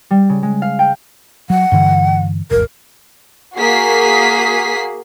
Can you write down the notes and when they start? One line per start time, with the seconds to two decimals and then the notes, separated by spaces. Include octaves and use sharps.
0.11 G3
0.29 C#3
0.43 G#3
0.62 F5
0.79 G5
1.50 F#3 F#5
1.72 G2 D3 E3
2.51 D#1 G#1 A#4
3.56 A#3 F#4 G#4 B6 C7